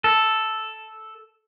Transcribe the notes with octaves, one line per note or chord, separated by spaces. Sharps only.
A4